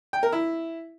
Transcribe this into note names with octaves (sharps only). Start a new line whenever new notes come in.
G5
A#4
E4